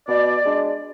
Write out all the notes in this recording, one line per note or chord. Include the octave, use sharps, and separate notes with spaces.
B2 D5
G#3 D4